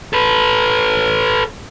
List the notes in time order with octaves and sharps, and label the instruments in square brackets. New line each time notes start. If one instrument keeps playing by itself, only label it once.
[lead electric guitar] A4 B4